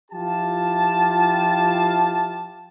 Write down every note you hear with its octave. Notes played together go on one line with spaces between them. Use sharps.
F3 E4 F4 G4 A5